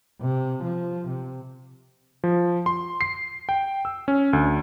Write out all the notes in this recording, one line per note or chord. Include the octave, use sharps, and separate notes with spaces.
C3
F3
C3
F3
C6
C7
G5
E6
C#4
D2